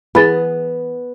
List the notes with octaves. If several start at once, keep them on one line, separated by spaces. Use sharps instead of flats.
E3 B3 G#4 B5 A6